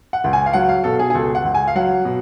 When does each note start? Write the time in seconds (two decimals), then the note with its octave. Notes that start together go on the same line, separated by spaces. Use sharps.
0.13 F#5
0.24 C#2
0.33 G#5
0.46 F5
0.53 F#3 F#5
0.69 F5
0.84 B2 A4
0.99 G#4
1.10 G#4
1.15 C#2 A4
1.35 F#5
1.45 C#2
1.55 G#5
1.68 F5
1.75 F#3 F#5
2.05 B2